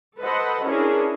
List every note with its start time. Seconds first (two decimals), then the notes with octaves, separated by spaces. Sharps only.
0.20 A4 B4 C5 D#5 F#5 B5
0.68 C#4 D4 E4 G#4 A#4 C#5